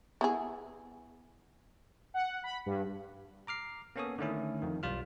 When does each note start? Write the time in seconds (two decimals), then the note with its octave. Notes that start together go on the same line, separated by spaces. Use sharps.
0.21 B3 E4 G#4
2.14 F#5
2.44 B5
2.66 G2
3.47 A#5 D6 F6 C7
3.96 A#3 B3 C#4 A4 C#5 D#6
4.18 D3 D#3 A3 C#4 E4
4.62 F2 D#3
4.83 B1 G3 F4 F6